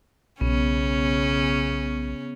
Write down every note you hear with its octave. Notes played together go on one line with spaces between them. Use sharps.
B1 C#3 B3 C#4